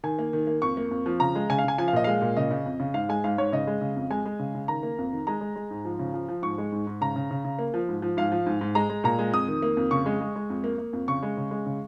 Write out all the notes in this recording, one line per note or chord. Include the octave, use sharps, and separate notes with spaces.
D#3 G#5
A#3
D#3
A#3
F2 C#6
A#3
F2
F3
C#3 A#5
G#3
C#3 G#5
F5
C#3 G#5
F3 G#5
F5
A#2 D#5
G#3 F5
A#2
C#3 D#5
C#3
F2
C#3
G#2 F5
G#3 G#5
G#2 F5
G#2 C#5
C#3 D#5
G#3
C#3
F2
G#3 G#5
G#3
C#3
C#3
D#3 A#5
A#3
F2
D#3
G#3 A#5
G#3
G#3
G#2
F3
C#3
F3
F3
G#2 C#6
G#3
G#2
G#2
C#3 A#5
C#3
C#3
C#3
A#3
F3
G#2
F3
G#2 F5
F3
G#2
G#2
G#3 A#5
G#3
A#2 A#5
G#3
F2 D#6
D#3
A#3
F2
C#3 C#6
G#3
G#3
G#3
F2
A#3
A#3
F2
C#3 C#6
G#3
C#3
G#3
C#3